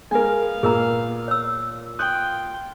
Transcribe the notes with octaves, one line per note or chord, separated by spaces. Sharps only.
G#3 B3 A#4 F5 G#5
A#2 G#4 A#4 A#5
C#5 E6
F4 G5 D#6 F#6 G6